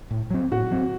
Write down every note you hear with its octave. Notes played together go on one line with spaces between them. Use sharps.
A2
F#3 C4
A2 F#4
F#3 C4